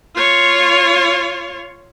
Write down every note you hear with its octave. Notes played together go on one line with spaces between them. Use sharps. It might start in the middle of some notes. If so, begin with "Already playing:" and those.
F4 C#5